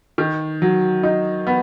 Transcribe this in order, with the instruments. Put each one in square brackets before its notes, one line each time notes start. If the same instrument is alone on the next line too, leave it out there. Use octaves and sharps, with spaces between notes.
[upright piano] D#3
F#3
D#4
B3